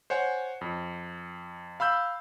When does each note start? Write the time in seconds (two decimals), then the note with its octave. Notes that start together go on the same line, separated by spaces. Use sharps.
0.10 C5 C#5 F#5 G#5
0.61 F2
1.80 F5 B5 E6 G6